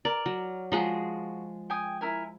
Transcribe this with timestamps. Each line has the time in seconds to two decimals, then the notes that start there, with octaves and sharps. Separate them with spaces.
0.05 A#4 D5
0.26 F#3
0.72 F3 G#3 D#4 F#4 G#4
1.70 G5 G#5 D#6
2.01 E4 A#4 G#5